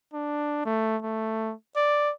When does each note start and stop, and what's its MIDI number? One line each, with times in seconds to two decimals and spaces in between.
0.13 0.62 62
0.65 0.97 57
1.02 1.54 57
1.76 2.11 74